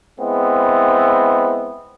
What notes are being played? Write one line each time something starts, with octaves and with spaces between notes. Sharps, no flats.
G#3 B3 C4 E4